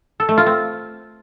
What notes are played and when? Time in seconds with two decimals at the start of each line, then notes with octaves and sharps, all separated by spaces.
0.20 A4
0.29 A3
0.37 F4
0.46 C4